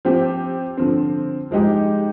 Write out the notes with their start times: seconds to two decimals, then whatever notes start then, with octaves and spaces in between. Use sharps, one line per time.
0.05 F3 C4 G4
0.77 D3 F3 C4
1.51 F3 G#3 D#4 G4